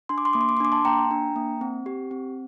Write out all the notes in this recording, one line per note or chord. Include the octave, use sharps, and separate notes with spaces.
D4 C6
D6
C6
A#3 D6
C6
D6
C6
D4 D6
A5 C6
A#3 G5 A#5
D4
A#3
C4
G4
C4